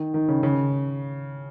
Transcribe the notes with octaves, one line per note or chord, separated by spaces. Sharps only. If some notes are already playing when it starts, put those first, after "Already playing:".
Already playing: D#3
D#3
C#3
C#3